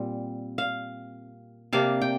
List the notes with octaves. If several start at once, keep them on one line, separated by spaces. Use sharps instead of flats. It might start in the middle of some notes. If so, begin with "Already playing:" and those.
Already playing: A#2 G3 C4
F5
C3 A#3 D4 F5
G5